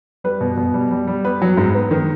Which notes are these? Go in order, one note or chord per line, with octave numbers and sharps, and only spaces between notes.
G3 B4
B2
B2
G3
G3
G3
B3 B4
F#3
G#2
B3
D#3